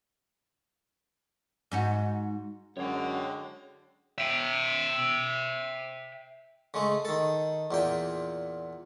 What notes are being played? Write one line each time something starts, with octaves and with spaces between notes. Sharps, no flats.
G#2 D#4 F#4
F#2 D3 G#3 F#4 C#5 G5
E5 G5
C#3 G#3 A3
D#3 A4
E2 A#2 G5